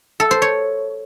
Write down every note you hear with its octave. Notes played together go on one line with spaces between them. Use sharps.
A4
C5
C#5